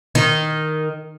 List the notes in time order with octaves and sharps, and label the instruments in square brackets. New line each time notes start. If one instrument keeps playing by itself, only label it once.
[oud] D#3